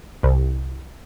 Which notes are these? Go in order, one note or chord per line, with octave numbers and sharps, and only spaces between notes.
C2